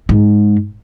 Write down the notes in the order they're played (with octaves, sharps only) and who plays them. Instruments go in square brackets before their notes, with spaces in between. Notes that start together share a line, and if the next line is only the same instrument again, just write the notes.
[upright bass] G#2